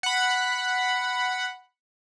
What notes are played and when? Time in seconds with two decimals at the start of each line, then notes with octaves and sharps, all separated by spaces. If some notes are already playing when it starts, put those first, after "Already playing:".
0.03 F#5 B5